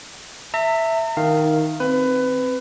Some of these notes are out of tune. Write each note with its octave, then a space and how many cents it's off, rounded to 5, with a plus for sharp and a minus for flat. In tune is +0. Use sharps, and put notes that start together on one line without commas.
E5 +0 A#5 -45
D#3 +0 F5 +0
C4 +0 B4 +20